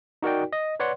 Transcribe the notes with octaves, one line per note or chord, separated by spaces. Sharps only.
D#4 F#4 A#4 D5 G5
D#5
B4 C#5 D5 F#5 C6